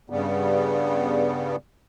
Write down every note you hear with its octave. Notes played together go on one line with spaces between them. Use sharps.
G2 C#3 G3 B3